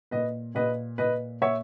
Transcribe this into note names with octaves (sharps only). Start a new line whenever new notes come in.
A#2 B4 D#5
A#2 B4 D#5
A#2 B4 D#5
A#2 C#5 E5